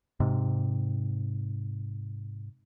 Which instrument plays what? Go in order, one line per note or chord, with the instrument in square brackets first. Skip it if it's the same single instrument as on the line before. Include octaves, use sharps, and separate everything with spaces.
[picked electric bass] G#2 C3